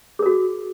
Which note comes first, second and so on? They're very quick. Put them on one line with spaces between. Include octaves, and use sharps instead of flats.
G#4 A#4 F#4